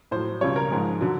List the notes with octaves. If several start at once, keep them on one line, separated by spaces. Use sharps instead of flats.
A2 F#3 C5
C#2 B2 G3 C#5
A#4
G#2 F3 G#3
D3 F#3